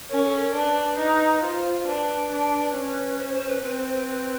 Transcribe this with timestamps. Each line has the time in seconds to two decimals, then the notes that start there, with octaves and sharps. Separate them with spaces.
0.10 C#4 A#4
0.24 A4
0.39 A#4
0.54 D4 B4
0.98 D#4
1.42 F4 C5
1.86 D4 B4
2.31 D4
2.74 C#4
3.18 C5
3.34 C5
3.48 B4
3.63 C4 B4
3.78 C5
3.92 B4
4.08 B4